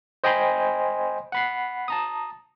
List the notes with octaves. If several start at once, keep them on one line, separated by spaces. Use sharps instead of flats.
C5 D#5 G5 G#5 B5 C6
F#5 B5 C7
A5 A#5 D#6